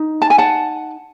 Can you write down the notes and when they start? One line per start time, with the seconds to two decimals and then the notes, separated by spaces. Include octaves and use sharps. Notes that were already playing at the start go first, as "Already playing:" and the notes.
Already playing: D#4
0.22 A5
0.30 G#5
0.38 F#5 A5